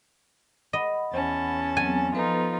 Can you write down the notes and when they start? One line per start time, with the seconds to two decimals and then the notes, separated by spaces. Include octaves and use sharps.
0.73 D#5 F#5 B5
1.13 E2 C#4 A5
1.77 F#3 B3 C4 G#5
2.15 F3 B3 D#4 F4 A4 B4